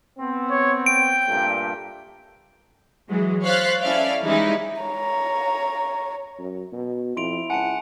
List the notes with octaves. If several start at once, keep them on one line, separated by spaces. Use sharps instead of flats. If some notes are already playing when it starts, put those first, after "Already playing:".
B3 C4
C#5
G5 D7
G2 A#2 A3
E3 F#3 G#3
C5 C#5 F5 F#6 A6 B6
C#4 E4 A4 D5 E5 F5
E3 G3 G#3 C#4 D#4 E4
C#5 A#5
F#2
B2
F2 E4 C6 D7 F7
C#2 F#5 G#5 A5 C#7